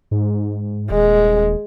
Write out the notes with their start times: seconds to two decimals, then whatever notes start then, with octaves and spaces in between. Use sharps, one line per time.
0.11 G#2
0.91 D#1 G#3